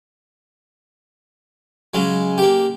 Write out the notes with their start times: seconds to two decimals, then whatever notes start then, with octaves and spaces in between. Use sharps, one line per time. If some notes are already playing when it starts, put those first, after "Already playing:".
1.94 C#3 F#3 G#3
2.38 A#3 G4